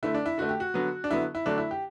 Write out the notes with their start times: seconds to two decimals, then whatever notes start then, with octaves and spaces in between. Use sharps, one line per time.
0.03 D3 A3 E4
0.14 D4
0.26 E4
0.38 D3 A3 F#4
0.49 G4
0.60 F#4
0.74 D3 F#3 B3
1.04 D4
1.11 D3 F#3 B3 E4
1.35 E4
1.46 D3 F#3 A3 D4
1.58 E4
1.71 G4